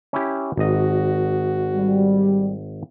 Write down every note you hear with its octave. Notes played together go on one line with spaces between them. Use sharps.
C#4 E4 G4
G#1 F#4 D#5
G3